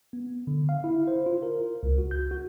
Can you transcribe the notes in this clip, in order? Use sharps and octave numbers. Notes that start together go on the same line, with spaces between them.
B3
D3
F5
E4
C5
F4
A#4
C#2
F#4
G6
F#4